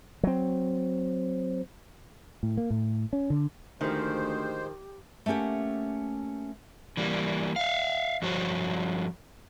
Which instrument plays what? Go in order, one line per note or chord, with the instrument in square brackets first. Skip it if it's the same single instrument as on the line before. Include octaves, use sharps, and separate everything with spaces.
[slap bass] F#3 C4
[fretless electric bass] A2
A#3
A2
C#4
D3
[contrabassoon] D2 [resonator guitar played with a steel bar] D#3 F3 [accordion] G#3 C5 [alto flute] G4
[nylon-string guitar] A3 A#3 C#4 G4 F#5
[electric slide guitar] E3 G3 A#3
E5 F5
G2 F3 F#4 C5 C#5